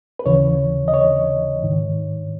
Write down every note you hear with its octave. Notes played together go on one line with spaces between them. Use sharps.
B4
D#2 C#3 E3 C#5
D#5
C#5
G#2 D#3